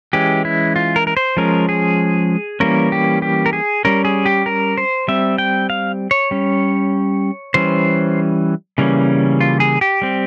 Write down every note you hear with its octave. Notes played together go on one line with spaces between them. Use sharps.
E3 G#3 C#4 G4
E4
F4
A#4
A#4
C5
F3 G#3 C#4 A#4
G#4
E3 G3 A#3 C#4 A#4
G4
G4
A#4
G#4
G3 C#4 A#4
G#4
G4
A#4
C5
G3 C4 E5
G5
F5
C#5
G3 C#4
E3 G3 C#4 C5
C#3 E3 G3 A#3 C#4
F4
G#4
G4
G3 C4